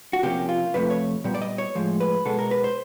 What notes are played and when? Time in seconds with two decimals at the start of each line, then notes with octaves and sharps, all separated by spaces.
0.13 F#4
0.23 C3 F3 A#3 C#4 G4
0.49 F4
0.74 F2 C3 F3 A3 B4
0.90 C#5
1.24 A#2 G3 B3
1.35 D5
1.41 D#5
1.58 C#5
1.75 A2 F3 G#3
2.00 B4
2.25 B2 G#3 B3 A4
2.39 A#4
2.51 B4
2.64 C5